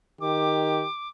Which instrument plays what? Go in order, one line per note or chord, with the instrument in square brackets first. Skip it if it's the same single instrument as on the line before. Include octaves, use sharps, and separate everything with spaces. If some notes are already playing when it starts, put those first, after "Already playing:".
[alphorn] D#3 [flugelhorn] G4 [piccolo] D6